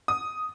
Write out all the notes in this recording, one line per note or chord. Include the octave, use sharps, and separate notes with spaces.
D#6